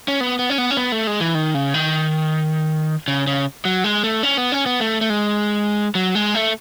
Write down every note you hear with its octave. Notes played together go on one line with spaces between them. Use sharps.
C#4
B3
B3
C#4
B3
C#4
B3
A3
G#3
E3
D#3
C#3
D#3
C#3
C#3
F#3
G#3
A3
C#4
B3
C#4
B3
A3
A3
G#3
F#3
G#3
A3